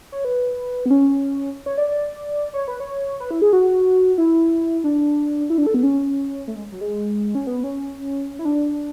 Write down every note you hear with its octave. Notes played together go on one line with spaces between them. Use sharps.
C#5
B4
B3
C#4
C#5
D5
D5
C#5
B4
C#5
B4
E4
G#4
F#4
E4
D4
E4
D4
A4
B3
C#4
A3
G#3
F#3
G#3
C#4
B3
C#4
E4
D4